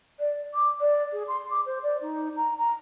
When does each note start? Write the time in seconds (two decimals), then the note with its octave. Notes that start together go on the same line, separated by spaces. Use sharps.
0.20 D5
0.54 D6
0.80 D5
1.13 G#4
1.28 C6
1.50 D6
1.66 C5
1.83 D5
2.01 D#4
2.36 A#5
2.58 A#5